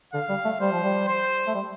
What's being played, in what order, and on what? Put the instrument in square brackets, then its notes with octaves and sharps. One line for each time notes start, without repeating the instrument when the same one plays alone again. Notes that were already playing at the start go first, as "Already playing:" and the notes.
[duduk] D3 [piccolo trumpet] F5
[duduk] G3
A3
[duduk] G3 [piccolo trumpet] C5
[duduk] F3
G3
[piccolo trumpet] C5
[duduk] A3
G3